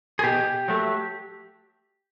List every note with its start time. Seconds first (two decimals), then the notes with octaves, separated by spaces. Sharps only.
0.19 G#4
0.23 B2 G4
0.68 F#3 A3